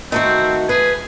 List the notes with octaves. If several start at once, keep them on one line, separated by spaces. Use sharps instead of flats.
D#3 A3 C4 F#4
G#4 B4